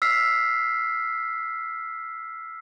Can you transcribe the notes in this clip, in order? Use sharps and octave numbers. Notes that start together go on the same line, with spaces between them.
E6 F6 B6 C7